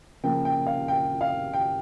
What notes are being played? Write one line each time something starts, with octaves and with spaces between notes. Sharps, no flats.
C#3 F3 A#3 G5
G5
F5
G5
F5
G5